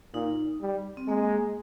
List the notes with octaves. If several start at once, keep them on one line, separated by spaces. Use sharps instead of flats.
A#2 D#4
G3
C4
G#3 A#3